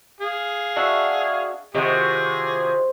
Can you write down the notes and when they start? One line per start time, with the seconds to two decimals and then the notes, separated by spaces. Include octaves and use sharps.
0.20 G#4 F5
0.76 D4 F#4 E5
1.74 C3 D#3 F4 F#4 G#4